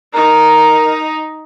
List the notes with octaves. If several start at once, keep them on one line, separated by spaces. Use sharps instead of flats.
D#4 A#4